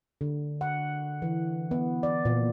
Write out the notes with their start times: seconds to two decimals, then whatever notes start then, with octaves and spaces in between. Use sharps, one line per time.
0.21 D3
0.61 F#5
1.22 E3
1.71 B3
2.03 D5
2.25 A#2